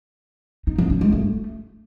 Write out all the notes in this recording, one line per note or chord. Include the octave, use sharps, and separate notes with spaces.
D#4
F3
C#4
G#3
A3